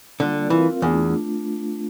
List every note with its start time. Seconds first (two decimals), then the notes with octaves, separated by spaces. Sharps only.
0.20 D3 G3 A#3 F4 A4 D5
0.50 E3 C4 F4 A#4 F5
0.82 E2 A3 D4 F4